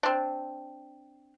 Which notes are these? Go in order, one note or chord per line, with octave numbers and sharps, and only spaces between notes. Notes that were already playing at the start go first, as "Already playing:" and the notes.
C4 D4